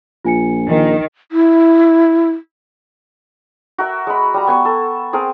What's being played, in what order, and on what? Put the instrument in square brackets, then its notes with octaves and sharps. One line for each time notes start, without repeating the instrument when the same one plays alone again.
[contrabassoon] A#1 [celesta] F4 G#5 C#7
[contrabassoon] A#1 [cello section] D#3
[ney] E4
[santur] F#4 A#4 E5
G#3 B5
G3 A#5
B3 G#5 C#6
A4
C4 G#4 A#4